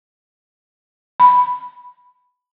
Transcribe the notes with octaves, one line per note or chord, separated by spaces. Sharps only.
B5